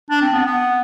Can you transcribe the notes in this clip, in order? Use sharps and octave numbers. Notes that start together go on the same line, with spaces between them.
D4
C4
B3
B3